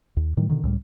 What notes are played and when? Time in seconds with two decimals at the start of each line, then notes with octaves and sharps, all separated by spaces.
0.17 D#2
0.37 A2 D#3 F#3 G3
0.49 B2 D3 D#3
0.63 C#2 A2 G3